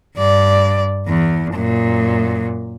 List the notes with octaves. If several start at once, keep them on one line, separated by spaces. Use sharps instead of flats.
G2 D5
E2
F#2 A#2